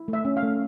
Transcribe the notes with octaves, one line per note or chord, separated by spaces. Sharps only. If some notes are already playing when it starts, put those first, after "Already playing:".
Already playing: E4
A3
E5
C#4
F5
A3